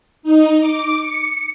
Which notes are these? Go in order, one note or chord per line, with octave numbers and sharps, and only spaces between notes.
D#4
D6
C#7